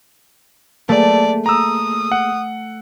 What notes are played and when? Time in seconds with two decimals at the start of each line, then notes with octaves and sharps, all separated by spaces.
0.89 A3 A#3 G#4 D5
1.46 A#5 D#6 E6
2.12 F#5